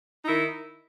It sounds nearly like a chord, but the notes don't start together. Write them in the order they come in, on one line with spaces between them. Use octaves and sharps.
D#4 D#3 E4